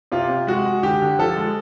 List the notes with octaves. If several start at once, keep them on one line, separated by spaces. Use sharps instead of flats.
C3 F4
C3
G#3 F#4
G#3
D3 G4
D3
F3 A4
G#3